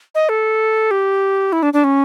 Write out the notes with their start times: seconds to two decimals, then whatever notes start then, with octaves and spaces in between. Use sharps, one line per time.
0.15 D#5
0.29 A4
0.91 G4
1.52 E4
1.63 D4
1.73 D4
1.84 C#4